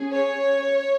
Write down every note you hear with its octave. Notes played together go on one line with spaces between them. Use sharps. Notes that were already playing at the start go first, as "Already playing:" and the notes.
Already playing: C#4 G#4
C#5